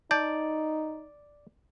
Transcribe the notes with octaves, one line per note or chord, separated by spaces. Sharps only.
D#4 D5 A5 G6